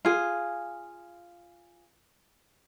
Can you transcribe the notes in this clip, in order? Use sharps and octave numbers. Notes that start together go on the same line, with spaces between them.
F4 G#4